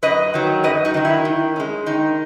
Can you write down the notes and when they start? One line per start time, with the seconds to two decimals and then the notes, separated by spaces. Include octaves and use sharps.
0.03 F#2 B4 D#5
0.34 D#3 F#3
0.64 F#2 B4 D#5
0.85 D#4 F#4
0.94 D#3 F#3
1.05 E4
1.25 D#3
1.56 G#3 C#4
1.86 D#3 D#4